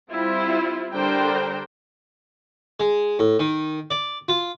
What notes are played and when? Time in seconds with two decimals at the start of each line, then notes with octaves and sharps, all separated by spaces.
0.10 G3 C4 E4 F4
0.94 D3 G3 D4 A#4 C5 G5
2.80 G#3
3.19 A2
3.39 D#3
3.91 D5
4.28 F4